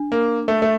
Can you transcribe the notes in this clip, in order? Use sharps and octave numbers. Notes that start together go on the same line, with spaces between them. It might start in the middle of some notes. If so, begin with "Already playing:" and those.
Already playing: D4
A#3
A3
A3